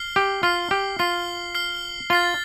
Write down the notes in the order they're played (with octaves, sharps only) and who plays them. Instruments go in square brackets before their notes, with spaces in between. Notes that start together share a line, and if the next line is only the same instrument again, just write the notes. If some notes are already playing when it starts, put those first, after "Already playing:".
Already playing: [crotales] F6 C7 G7
[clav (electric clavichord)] G4
[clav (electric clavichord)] F4 [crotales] F6 C7 G7
[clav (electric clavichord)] G4
[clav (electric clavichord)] F4 [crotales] F6 C7 G7
[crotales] F6 C7 G7
[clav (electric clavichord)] F4 [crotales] A6 C7 G7